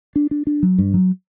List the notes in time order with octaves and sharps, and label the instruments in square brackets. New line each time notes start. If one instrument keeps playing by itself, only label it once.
[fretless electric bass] D4
D4
D4
F#3
G2
F#3